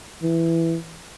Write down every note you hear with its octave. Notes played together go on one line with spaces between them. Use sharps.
E3